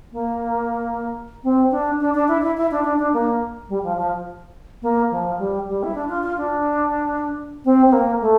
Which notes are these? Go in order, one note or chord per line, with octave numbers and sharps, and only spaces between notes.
A#3
C4
D4
D4
D4
E4
E4
E4
D4
D4
D4
A#3
G3
F3
F3
A#3
F3
G3
G3
E4
D4
F4
F4
D4
C4
C4
A#3
A3